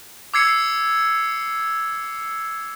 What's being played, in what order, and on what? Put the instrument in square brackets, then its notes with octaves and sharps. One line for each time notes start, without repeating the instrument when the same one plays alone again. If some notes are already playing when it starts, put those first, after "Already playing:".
[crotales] D6 E6 G#6 C7 C#7